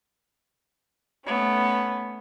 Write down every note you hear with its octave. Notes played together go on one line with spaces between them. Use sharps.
A3 B3 C#4